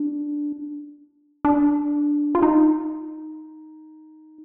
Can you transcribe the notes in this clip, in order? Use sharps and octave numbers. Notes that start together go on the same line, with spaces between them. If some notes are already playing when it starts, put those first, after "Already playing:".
Already playing: D4
D4
F4
D#4